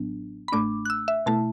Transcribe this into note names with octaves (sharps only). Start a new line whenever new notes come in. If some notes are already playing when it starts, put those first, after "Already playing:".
Already playing: A1 A2 F#3 B3 D4
B5
A1 A2 A3 D4 D6
F#6
E6
E5
B2 A3 E4 A5